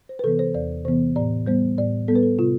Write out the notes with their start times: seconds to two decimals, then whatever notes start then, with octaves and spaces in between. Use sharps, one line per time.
0.09 C5
0.19 B4
0.24 C3 E3 B3 A4
0.39 C5
0.54 E2 D5
0.85 C3 E3 B3 C5
1.16 A2 D5
1.46 G3 B3 C5
1.78 A2 D5
2.08 G3 B3 A4
2.16 B4
2.23 A4
2.39 C3 F4